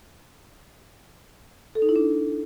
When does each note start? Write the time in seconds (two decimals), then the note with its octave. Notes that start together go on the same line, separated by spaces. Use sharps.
1.75 A4
1.82 D#4
1.89 E4
1.96 D4